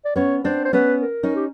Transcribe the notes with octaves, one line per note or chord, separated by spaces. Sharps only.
D5
B3 C#4 C#5
C4 D4 C5
C5
B3 C#4 B4
A#4
C#4 D#4
G4